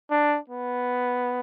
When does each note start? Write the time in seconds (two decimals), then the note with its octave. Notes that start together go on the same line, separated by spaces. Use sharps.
0.11 D4
0.49 B3